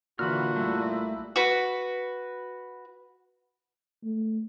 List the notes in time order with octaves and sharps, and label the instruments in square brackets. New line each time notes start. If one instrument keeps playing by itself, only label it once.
[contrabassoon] A#2 [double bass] D3 E3 [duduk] F#4 [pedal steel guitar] B5 E6 F6
[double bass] G3 E4 [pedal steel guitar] A3
[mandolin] F#4 B4
[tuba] A3